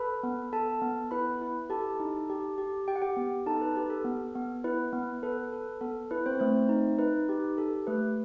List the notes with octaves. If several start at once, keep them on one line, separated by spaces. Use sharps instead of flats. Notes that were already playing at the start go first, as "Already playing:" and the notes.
Already playing: A4 B4 B5
B3
A4 A5
B3
E4 B4 B5
E4
G4 A4 A5
D#4
G4
G4
G4 G5
F#5
G4 G5
B3
D#4 A4 A5
B4
G4 B4
A4
B3
B3
E4 B4
B3
A4 B4
A4
B3 A4
E4 B4
C4 C5
A3 C4 C5
D#4
D#4 B4
G4
G4 A4
A3 B4